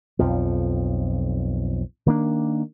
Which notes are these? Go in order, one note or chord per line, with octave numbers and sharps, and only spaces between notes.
B1 F2 F3
D#3 A#3 D4